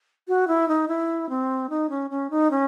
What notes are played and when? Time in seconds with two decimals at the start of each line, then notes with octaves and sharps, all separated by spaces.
0.28 F#4
0.48 E4
0.68 D#4
0.88 E4
1.29 C4
1.70 D#4
1.90 C#4
2.10 C#4
2.30 D#4
2.51 C#4